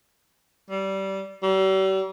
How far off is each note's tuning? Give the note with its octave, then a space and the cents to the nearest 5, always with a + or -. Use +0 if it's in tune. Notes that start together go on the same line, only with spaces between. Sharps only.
G3 -20
G3 -45